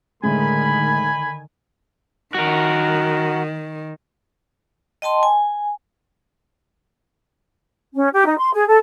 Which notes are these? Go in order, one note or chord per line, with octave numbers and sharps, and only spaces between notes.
A2 D3 D#3 G#3 G#5 B5
D#3 F#4 A#4
D#5 G5 A5 C6
G#5
C#4
G4
D#4
C6
G#4
A4